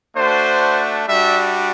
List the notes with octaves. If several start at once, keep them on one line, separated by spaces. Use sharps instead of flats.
A3 D4 F#4 C5
G3 D4 F#4 E5